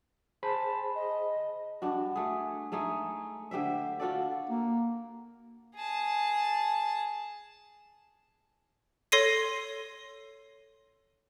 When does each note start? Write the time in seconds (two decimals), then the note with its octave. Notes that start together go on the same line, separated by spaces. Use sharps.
0.43 G#4 C5 A5 B5
0.95 D#5
1.82 G2 D4 F#4
2.16 A3 G#4
2.72 G#3 A3 D#4 G#4
3.51 D3 G4 C5 E5
3.99 F4 F#4 A4 D5
4.50 A#3
5.75 G#4 A5
9.12 A4 C#5 C6 A#6 C7 D#7